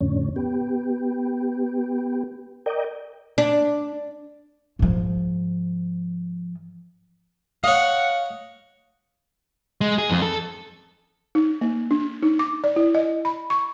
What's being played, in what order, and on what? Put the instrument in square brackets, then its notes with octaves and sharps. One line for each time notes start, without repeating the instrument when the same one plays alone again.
[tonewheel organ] F2 A2 D3 C#4
B3 G4
A#4 D5 D#5 G5
[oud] D4
[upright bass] G#2 F3
[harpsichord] C#5 D#5 [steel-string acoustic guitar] F5 [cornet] F#5
[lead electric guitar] G#3
G#4
F2
A4
[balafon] D#4
A#3
D4
D#4
D6
D5
E4
D#5
B5
C#6